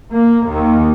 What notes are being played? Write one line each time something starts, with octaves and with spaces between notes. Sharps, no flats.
A#3
D#2